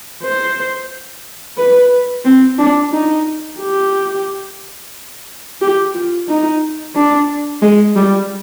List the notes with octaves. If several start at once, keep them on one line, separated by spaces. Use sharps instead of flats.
C5
B4
C4
D4
D#4
G4
G4
F4
D#4
D4
G#3
G3